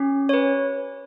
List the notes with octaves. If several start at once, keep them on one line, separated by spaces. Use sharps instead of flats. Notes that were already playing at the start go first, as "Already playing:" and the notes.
Already playing: C#4 G4
C#5
B4